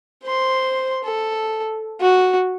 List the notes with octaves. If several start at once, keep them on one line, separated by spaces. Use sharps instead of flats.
C5 C6
A4
F#4